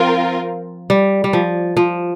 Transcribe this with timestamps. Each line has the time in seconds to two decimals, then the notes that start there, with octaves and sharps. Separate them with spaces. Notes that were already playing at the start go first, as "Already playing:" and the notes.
Already playing: F3 C4 F4 A#4
0.90 G3
1.24 G3
1.33 F3
1.77 F3